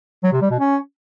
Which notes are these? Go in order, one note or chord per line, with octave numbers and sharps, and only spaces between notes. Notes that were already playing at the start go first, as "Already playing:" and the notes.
F#3
C3
G3
B2
C#4